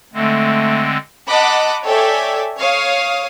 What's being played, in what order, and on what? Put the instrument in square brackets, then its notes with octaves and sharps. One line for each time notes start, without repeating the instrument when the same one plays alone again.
[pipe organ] D3 G#3 C4 [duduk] A3
[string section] D#5 F#5 A5 B5 D6
A4 C#5 D5 E5 G5 G#5
C#5 F5 D#6